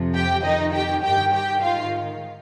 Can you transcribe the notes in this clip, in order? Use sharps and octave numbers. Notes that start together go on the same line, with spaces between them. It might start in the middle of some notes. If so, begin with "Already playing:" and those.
Already playing: F2 C3 F3
G4 G5
F2 D#3 D#4 D#5
G4 G5
G2 D#3 G4 G5
G4 G5
G#2 D#3 F4 F5